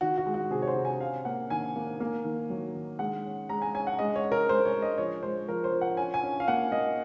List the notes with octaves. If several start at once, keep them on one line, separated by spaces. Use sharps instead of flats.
D#3 F#4
F#4
G#3
F#4
C3 G#4
C#5
C5
C3
G#5
C#4 F5
A#3 F#5
D#3 G#5
A#3
A#3
D#3
F#3
D#3
G#3 F#5
C#4
G#3 A#5
G#5
C#4 G#5
F#5
G#3 D#5
C#5
C#4
A#4
G#3 C5
C#5
G#3
D#5
F3 C#5
G#3 C5
F3 A#4
C5
F3
F#5
C#4 G#5
G#5
C#4
F5
A#3 F#5
A#3 D#5